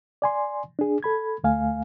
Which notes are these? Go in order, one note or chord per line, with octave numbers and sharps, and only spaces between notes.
D5 G#5 C6
D4 G#4
A4 B5 G#6
D2 A3 F5 G#5